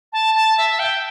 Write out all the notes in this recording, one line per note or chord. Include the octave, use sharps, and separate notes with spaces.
A5
A5
E5
G5